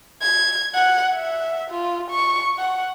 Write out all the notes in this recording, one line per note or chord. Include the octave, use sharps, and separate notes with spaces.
G#6
F#5
E5
F4
C#6
F#5